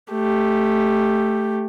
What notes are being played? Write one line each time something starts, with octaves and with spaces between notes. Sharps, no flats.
A3 G4